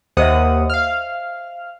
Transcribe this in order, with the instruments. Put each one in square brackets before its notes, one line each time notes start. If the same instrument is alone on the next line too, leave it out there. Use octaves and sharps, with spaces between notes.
[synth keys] D#2 F#5 D#6 [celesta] C5 D#5 E5
[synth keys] F5 F6